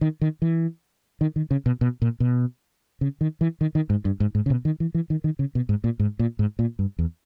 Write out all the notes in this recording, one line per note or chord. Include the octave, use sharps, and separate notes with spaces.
D#3
D#3
E3
D#3
D#3
C#3
B2
B2
A#2
B2
C#3
D#3
E3
D#3
D#3
G#2
G2
G#2
G#2
C#3
B2
D#3
E3
E3
D#3
D#3
C#3
B2
G#2
A#2
G#2
A#2
G#2
A#2
G2
E2